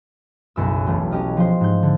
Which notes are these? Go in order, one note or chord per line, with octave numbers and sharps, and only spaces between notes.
F#1 B1 F#2 E6
E1 A3
C#4 G4 D#5 F6
F3 C5
G#2 G6
D3